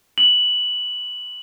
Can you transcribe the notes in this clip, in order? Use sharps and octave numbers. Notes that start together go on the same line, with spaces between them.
F#7